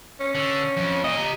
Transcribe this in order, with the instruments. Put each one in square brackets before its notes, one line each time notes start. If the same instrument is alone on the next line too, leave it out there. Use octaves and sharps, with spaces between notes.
[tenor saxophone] C#4
[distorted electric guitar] D3
F2
[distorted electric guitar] A#2 [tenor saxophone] D#5
[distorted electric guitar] G4 A#5